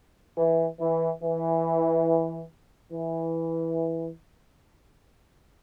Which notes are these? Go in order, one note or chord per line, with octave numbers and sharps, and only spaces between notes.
E3
E3
E3
E3